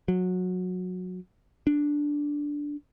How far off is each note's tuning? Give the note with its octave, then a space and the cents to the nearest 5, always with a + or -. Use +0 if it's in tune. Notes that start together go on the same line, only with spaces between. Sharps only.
F#3 -20
D4 -5